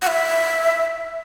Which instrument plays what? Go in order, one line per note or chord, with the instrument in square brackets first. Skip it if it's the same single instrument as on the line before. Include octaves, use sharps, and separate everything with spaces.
[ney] F#5
E5